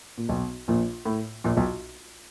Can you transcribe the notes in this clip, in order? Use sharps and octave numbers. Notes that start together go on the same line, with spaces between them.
A#2
B1 B2
A#1 A#2
A2
A#1 A#2
B1 B2